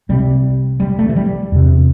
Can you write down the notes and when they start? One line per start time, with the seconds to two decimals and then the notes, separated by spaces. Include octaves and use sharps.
0.09 C2 C3 G3
0.80 G3
0.99 A3
1.09 E3
1.16 G3
1.52 E2 C3